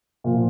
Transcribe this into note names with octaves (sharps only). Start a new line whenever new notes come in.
A#2 F3